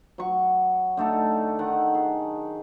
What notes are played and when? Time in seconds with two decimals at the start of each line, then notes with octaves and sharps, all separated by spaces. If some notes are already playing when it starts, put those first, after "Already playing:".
0.18 F#3 C#6
0.97 D3 A3 D#4 A4
1.59 D#3 F#5
1.94 G#4